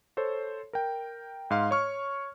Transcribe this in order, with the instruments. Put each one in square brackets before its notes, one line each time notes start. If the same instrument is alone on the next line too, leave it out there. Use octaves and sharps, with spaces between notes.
[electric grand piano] A4 C5 C#5
A#4 G5
G#2 F5 C6
C#5 C#6 F6